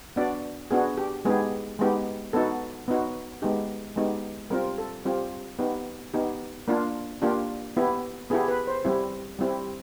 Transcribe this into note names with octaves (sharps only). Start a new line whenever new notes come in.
B3 D4 F#4 D5
B3 D4 F#4 G#4
G4
G#3 B3 D#4 G4 G#4
G#3 B3 D#4 G4
B3 D#4 F#4 A4
B3 D#4 F#4
G#3 B3 D#4 G4
G#3 B3 D#4 G4
G3 C4 F4 A#4
A4
G3 C4 F4 G4
B3 D#4 G4
B3 D#4 G4
A#3 D4 F4
A#3 D4 F4 G4
B3 E4 G4
B3 E4 G4 G#4
B4
C5
G3 C4 E4 G4
G3 C4 E4 G4